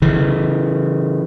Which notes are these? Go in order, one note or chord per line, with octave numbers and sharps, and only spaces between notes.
C#3 E3